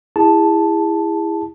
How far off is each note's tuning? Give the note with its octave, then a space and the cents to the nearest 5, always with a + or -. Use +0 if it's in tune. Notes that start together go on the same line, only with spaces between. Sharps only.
E4 +5 G#4 -30 A5 +0